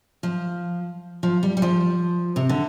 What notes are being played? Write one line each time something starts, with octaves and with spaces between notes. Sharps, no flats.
F3
F3
G3
G3
F3
C3
D3